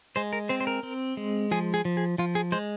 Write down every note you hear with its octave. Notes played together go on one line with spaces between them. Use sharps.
G#3 C5
A#4
C4 C5
C5
A#4
C4
G#3
F3 G#4
G#4
F3
G#4
F3 F4
G#4
G#3 C5